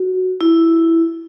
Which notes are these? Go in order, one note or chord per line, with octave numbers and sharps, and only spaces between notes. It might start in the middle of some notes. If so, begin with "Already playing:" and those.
Already playing: F#4
E4